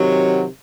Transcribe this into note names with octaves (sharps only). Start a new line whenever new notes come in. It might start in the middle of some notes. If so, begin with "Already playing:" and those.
Already playing: C3 D#3 F#3